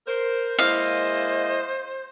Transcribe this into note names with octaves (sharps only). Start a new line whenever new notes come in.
A#4 C5
G#3 A#3 E4 C5 D#5 F5